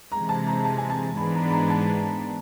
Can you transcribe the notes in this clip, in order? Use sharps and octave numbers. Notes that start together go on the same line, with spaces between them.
C3 E3 G#3 A#5
A5
A#5
A5
G#5
A5
G#2 E3 G#3 B3 D4 B5
A#5
B5
A#5
A5